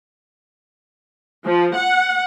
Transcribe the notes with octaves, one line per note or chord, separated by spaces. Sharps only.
F3
F#5